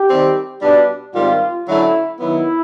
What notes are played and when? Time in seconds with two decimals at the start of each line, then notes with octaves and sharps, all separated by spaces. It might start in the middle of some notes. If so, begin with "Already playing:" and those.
Already playing: G4
0.09 D#3 G3 C4
0.61 B2 G3 B3 D4
1.14 G#2 D#3 G3 C4 F4
1.67 D3 F#3 A3 C#4 E4
2.19 D#3 F#3 B3 E4